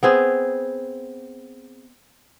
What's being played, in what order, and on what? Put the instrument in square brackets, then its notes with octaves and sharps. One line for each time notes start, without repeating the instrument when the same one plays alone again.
[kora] B3 C4 G#4